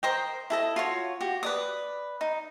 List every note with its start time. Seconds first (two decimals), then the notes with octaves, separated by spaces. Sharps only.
0.03 A#4 C5 D#5 G5
0.50 E4 A4 D#5
0.76 F4 F#4 C#5
1.21 F#4 G4
1.43 B4 D5 D#6
2.21 D#4